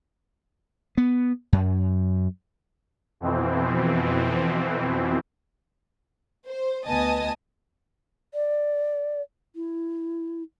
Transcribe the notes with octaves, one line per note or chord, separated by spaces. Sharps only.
B3
F#2
F2 B2 E3 C4
C5
D2 B3 D#5 G#5 A5 D#6
D5
E4